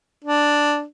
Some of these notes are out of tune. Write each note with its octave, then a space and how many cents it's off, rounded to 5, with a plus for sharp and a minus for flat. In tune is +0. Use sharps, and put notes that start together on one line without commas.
D4 +0